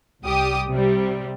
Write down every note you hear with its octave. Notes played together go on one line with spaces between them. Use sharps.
C2 G3 G4 D#6
C3 G3